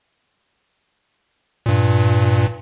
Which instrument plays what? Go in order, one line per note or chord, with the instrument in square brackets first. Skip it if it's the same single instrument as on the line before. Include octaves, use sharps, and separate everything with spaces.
[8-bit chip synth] G2 A#2